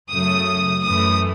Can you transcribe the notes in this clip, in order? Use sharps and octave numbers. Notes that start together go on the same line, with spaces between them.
F#2 C#3 F#3 A3 D#6
F#2 E3 A3 D#6